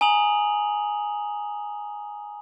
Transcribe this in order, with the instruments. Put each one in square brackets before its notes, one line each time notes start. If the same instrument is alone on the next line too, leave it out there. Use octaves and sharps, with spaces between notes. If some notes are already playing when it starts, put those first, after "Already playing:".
[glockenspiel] G#5 A#5 D#6 F7 F#7